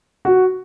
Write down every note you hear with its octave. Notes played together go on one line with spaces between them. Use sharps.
F#4